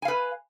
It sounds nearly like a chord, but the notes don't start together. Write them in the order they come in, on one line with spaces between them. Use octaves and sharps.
G#5 F5 B4